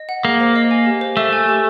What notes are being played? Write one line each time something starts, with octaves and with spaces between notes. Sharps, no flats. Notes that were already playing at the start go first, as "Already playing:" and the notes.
Already playing: D#5
F#5
A#3 G#4
C5
D#5
G#5
G4
C5
A3 E5
G#5
G4